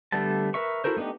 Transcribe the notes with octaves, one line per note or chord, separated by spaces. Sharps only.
D3 G3 A3 B3 A5
A#4 B4 E5 C#6
E4 F#4 A4 A#4 C5
A3 B3 D4 D#4 G4